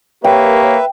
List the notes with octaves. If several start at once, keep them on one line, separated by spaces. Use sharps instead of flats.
A#3 G4 A#4 B4 C#5 E5 G5